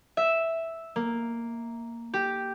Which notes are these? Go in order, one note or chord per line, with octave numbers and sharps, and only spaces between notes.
E5
A#3
G4